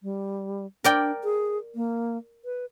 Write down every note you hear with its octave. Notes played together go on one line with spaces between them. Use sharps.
G3
D4 A#4 D5 G5
G#4
A#3
B4